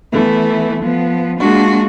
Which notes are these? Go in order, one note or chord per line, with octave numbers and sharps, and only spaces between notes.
E3 A3 B3 E4
F3 B3
G#3 A#3 D4 F4 F#4